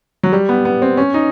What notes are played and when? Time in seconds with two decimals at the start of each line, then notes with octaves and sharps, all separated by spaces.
0.23 F#3
0.33 G3
0.49 B3
0.65 B3
0.82 C4
0.97 C#4
1.14 D#4